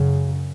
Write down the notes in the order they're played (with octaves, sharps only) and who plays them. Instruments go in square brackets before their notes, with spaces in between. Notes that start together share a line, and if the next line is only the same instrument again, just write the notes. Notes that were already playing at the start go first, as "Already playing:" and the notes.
Already playing: [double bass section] F#2 C#3